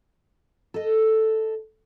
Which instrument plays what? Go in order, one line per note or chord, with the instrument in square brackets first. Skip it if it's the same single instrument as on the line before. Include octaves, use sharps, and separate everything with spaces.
[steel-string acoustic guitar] A4 D#5